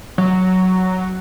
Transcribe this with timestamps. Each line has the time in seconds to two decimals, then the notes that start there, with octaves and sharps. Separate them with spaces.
0.18 F#3